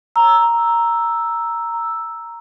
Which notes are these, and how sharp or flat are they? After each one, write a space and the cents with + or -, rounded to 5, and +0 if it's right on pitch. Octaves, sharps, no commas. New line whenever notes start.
A#5 +0 E6 +0